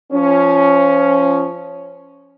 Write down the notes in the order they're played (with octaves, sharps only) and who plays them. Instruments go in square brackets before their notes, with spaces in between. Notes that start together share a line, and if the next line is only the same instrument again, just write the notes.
[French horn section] F3 C#4